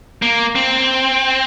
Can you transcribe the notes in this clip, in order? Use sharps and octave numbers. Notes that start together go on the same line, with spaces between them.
A#3
C4